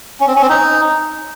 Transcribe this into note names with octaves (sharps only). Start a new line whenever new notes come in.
C#4
C4
C#4
C4
D#4